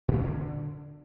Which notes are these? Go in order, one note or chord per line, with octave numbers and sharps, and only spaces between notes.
A#2
G#2
C#4
D3